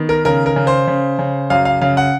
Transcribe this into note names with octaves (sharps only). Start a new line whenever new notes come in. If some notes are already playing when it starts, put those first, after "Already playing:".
Already playing: D#3 B3
A#4
C#3 A#4
A#4
C#3
C5
C#3
C#3
F#2 F5
F5
C#3 F5
F#5